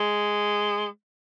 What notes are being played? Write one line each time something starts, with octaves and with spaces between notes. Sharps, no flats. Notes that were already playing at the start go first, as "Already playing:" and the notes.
Already playing: G#3